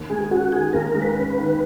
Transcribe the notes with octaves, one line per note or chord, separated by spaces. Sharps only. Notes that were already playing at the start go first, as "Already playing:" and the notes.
Already playing: D#2
G#3 G#4
G#4
C#4 F#4
D#3 G#4
D#2 A#4
G#3
B4
C#4
B4
D#3